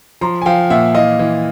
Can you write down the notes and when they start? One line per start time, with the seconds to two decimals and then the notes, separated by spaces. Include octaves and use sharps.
0.21 F3 A#5 C6
0.42 G#5
0.46 F3 F5 G5
0.70 A#2 E5 F#5
0.95 E3 D#5 F5
1.19 E3